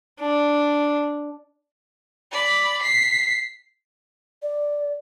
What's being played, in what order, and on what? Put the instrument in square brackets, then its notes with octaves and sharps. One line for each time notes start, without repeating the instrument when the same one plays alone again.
[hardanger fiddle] D4
[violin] D5 B5
B6 C7
[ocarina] D5